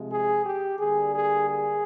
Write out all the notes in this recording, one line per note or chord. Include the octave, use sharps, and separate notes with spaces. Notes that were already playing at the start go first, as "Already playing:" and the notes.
Already playing: C3 F3 G#3
G#4
G4
D3 G3 A#3 G#4
G#4
G#4